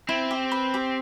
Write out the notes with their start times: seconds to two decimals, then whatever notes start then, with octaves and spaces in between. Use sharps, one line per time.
0.09 C4 E4
0.31 G4
0.51 B4
0.74 G4